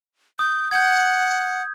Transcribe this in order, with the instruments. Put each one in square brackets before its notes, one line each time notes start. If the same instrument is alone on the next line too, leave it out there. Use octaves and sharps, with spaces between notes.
[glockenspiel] D#6 [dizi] G6
[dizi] F#5 [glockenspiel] G6 G#6